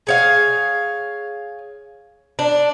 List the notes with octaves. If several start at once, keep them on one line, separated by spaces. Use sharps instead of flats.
G#4 C#5 F5
D4